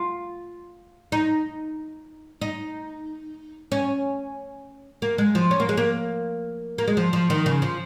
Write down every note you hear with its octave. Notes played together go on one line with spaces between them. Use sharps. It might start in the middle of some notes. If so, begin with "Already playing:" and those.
Already playing: F4
D#4
D#4
C#4
A#3
G#3
F3
C#4
A#3
G#3
A#3
A#3
G#3
F3
F3
D#3
C#3
F3